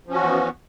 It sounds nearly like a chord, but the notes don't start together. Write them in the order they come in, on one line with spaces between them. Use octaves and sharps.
F3 C#4 F#4 E3 B3